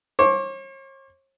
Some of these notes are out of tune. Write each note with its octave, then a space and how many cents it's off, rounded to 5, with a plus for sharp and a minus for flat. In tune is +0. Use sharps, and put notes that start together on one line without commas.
C#5 -45 D6 -40